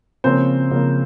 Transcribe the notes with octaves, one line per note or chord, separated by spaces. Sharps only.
C#3 F3 A#3 C4 C#4 C5
C#3 F3 A#3 C#4